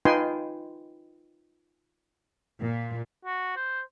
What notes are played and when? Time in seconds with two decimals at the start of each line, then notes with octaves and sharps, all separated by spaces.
0.05 D#4 F4 B4 G5 G#5 C6
2.61 A#2
3.25 F#4
3.56 C5